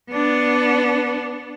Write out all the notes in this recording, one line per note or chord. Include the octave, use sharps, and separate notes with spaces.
B3 D4